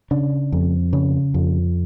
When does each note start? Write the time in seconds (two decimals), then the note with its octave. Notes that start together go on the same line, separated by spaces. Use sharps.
0.11 C#3 D4
0.52 F2
0.93 C#3
1.34 F2